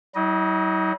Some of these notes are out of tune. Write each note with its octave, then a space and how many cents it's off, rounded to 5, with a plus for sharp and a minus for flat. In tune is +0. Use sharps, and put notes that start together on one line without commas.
F#3 +45 E4 -45 D#5 +0